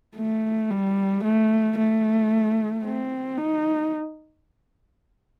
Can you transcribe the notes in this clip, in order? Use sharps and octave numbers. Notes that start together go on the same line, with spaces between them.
A3
G3
A3
A3
C4
D#4